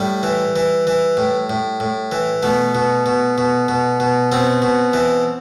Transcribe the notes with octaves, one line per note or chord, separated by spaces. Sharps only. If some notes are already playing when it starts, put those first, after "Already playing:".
Already playing: A2 G3
E3
E3
E3
A2
A2
A2
E3
B2 A3
B2
B2
B2
B2
B2
B2 C4
B2
E3